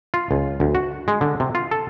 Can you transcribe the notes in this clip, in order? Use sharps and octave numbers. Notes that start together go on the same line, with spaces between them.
F4
C#2
D2
F#4
G#3
D3
C3
F4
A4